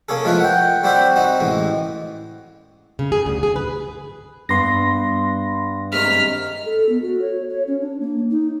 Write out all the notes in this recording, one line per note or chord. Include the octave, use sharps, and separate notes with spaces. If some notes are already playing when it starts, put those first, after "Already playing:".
A#3 C#4 G#4 A4
F3 G#3 A3 E4 F4 B4
F#5 G5
G3 C4 F#4 G4 C5 E5
C4 D#4 F#4
A1 E3 G#3
C#3
G#4
D2
G#4
B4
G2 B3 C6 A#6
G#2 C3 D#3 F6 B6
A4
B3
F#4
C#5
C#5
C#4
D4
A#3
D#4